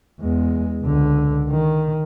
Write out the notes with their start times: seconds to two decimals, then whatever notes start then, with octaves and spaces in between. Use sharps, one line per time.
0.20 E2 G#3
0.83 C#2 D3
1.49 D#3